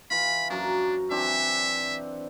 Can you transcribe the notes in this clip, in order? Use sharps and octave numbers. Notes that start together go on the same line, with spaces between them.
E3 F4 B5
F#2 D4 A#5
E3 C4 D4 E5